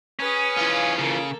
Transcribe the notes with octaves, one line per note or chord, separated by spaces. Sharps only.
C#4 G#4 B4
E3 F4
C#3 A#3 A4